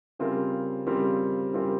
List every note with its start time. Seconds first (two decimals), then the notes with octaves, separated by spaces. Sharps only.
0.19 C#3 G3 C4 F4 A#4
0.87 C#3 G3 C4 F4 A#4
1.53 C#3 G3 C4 F4 A#4